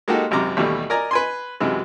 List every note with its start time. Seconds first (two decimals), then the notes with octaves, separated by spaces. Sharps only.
0.08 G#3 A#3 D#4 F#4 G4 A4
0.31 G#1 F#2 C3 A#5 D6
0.57 A1 D#2 B2 G3 A3
0.90 A#4 D5 D#5 G#5 A#5
1.11 B4 G#5 C6
1.60 F#2 C3 E3 F#3 G#3